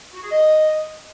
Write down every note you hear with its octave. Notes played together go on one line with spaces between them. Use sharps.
F#4
G#4
D#5